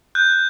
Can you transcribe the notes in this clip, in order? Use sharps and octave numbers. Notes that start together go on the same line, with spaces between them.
F#6 G6